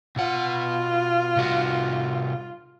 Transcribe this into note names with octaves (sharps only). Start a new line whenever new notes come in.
B2 F4 F#5
C2 F#4